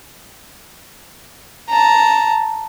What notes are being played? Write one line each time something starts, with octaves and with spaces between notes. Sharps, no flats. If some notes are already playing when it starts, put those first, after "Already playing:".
A5 A#5